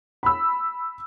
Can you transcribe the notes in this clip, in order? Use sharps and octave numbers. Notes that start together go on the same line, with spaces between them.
B5 E6